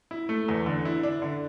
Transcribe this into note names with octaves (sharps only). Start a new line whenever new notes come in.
E4
A3
E2
D3
E4
D4
D3